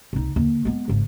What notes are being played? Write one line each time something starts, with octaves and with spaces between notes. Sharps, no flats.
C2 D#4
D#2 D3
G#3 B3
G#1 C#2